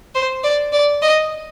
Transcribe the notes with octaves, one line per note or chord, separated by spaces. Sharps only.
C5
D5
D5
D#5